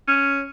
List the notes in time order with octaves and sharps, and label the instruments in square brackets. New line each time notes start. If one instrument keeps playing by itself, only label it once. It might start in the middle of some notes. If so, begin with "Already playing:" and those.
[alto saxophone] C#4